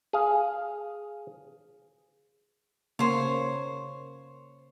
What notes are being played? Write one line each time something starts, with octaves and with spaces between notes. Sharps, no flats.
G#4 F5
C#3 A#3 C5 C#5